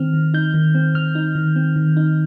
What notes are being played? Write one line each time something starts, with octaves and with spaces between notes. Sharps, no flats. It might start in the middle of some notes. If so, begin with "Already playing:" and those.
Already playing: D#3 C4 F6
D#3
D#4 G6
D#3
C4
D#3 F6
D#4
D#3
C4
D#3
D#4